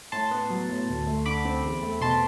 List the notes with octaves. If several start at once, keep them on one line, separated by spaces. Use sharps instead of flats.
A2 A5 C6
B3
F#3
A2
D2
A3
D3 B5 D6
C4
E2
A3
B2 A5 C6